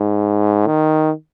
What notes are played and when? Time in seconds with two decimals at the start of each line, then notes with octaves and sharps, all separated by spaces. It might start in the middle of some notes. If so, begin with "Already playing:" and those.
Already playing: G#2
0.67 D#3